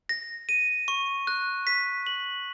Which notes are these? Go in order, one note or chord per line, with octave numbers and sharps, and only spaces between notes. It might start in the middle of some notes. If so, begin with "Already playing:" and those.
A#6
D#7
C#6
F#6
B6
F#7